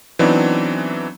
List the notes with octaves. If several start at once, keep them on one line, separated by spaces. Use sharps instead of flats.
E3 F#3 B3 C4 D4 D#4